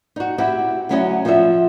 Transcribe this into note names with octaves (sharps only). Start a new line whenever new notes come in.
D#4 F#4
C4 E4 F#4 G4
D2 F#3 C#4 E4 F#4 D#5
F3 C4 F4 F#4 E5